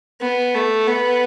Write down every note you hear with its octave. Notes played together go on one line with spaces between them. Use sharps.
B3
A3
B3